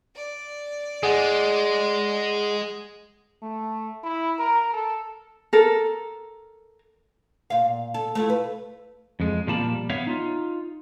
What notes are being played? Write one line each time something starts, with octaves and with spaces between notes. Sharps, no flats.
D5
G#3 G#4 F#5
A3
E4
A#4
A4
A4 A#4
A#2 F5
A4
A3 E4 F4
B4
F2 G#3
A#2 F3 G3 A#3 A5 B5
B3 C#5 E5 F5
D#4 F4